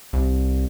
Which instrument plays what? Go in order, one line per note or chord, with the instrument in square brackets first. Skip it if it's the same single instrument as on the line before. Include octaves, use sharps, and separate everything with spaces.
[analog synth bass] C2